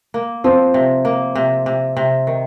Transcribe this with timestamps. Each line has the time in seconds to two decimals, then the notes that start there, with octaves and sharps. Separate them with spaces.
0.14 A#3
0.44 F3 C4
0.74 C3
1.05 A#3
1.35 C3
1.66 C3
1.97 C3
2.27 D#3